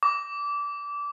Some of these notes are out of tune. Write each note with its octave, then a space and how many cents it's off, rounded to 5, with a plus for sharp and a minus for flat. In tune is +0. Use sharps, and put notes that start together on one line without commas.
D6 -20